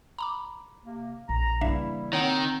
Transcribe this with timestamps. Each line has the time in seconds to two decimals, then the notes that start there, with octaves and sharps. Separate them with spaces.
0.19 A#5 B5 D6
0.85 C3 A#3
1.29 A#1 A#5
1.61 C#3 E3 G3 A#3 D4 E4 E5 F5
2.13 D#3 C4 C#5 F#5